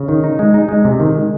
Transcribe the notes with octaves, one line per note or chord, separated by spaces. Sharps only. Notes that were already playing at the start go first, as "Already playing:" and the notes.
Already playing: C#3
D#3
D#4
G#3
D#4
G#3
C3
D#3
G#3